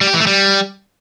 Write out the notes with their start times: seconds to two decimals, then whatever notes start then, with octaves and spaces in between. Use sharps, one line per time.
0.01 G3
0.07 G4
0.14 E3
0.20 A3
0.27 G3